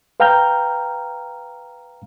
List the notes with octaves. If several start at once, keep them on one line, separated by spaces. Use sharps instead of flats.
B4 F5 G5 A#5 F6 G6